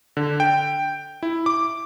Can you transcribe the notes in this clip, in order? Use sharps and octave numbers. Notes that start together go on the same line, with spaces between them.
D3
G5
E4
D6